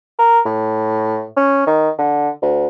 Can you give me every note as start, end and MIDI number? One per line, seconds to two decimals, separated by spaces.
0.19 0.40 70
0.46 1.25 45
1.37 1.64 61
1.67 1.90 51
1.99 2.29 50
2.42 2.68 38